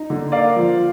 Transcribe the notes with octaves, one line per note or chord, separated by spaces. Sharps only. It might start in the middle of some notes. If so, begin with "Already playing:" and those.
Already playing: D#4
D3
A#3 D5 F5
F3